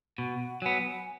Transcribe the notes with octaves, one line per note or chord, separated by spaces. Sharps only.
B2 F#5
F#3 B3 G#5